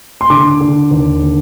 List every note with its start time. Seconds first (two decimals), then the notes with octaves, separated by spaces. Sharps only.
0.21 C6
0.30 D3 D6
0.61 D3
0.91 D#2
1.23 D3